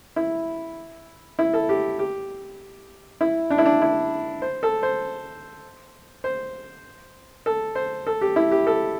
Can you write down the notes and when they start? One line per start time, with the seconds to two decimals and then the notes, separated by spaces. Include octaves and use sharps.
0.16 E4
1.39 E4
1.54 A4
1.69 G4
1.99 G4
3.21 E4
3.50 D4
3.58 E4
3.65 D4
3.82 E4
4.42 C5
4.63 A4
4.83 C5
6.24 C5
7.46 A4
7.75 C5
8.07 A4
8.21 G4
8.36 E4
8.51 G4
8.67 A4